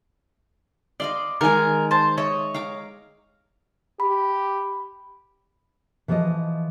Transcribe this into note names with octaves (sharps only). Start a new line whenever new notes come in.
D5 D#5 F5 C6
D#3 G#3 A#4 G#5
C5 A5
C#5 D#5 E5
F5 A#5 D6
G4 B5
E3 F3 A4 D5 D#5